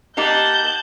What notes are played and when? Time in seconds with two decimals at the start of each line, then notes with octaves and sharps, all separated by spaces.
0.17 A#3 D#4 G4 F#5 A5 G6